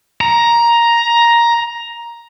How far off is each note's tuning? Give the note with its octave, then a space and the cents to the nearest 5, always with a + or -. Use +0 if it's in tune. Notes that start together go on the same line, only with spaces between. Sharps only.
A#5 +10